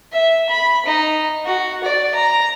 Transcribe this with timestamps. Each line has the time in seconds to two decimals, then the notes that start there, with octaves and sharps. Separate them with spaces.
0.12 E5
0.49 B5
0.86 D#4
1.45 F#4
1.84 D5
2.15 A#5